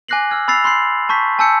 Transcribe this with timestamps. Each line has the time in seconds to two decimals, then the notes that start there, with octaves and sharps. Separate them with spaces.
0.08 G#5 D6 F#6 A#6 C7 F#7
0.31 G#5 E6 F6 G#6
0.48 B5 E6 A6 C7 F7
0.64 B5 C6 F#6 G6 C7 F#7
1.09 A5 C#6 G6 B6
1.39 G#5 A5 C#6 E6 G6 C#7